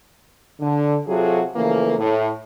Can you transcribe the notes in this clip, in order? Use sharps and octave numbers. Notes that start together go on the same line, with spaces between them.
D3
C3 F#3 F4 F#4 G#4 A4
C#3 E3 F3 A3 A#3
A2